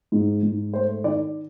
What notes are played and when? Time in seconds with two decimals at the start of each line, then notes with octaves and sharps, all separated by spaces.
0.12 G#2
0.43 G#2
0.73 A3 C5
1.04 D#3 D5